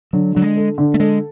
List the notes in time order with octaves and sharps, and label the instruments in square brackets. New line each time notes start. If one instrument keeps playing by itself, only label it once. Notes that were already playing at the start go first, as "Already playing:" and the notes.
[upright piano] D3 [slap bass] F#3
[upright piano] D3 [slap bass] F#3
[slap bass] G#3
[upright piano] A4
D3
[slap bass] A3
[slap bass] G#3 [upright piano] A4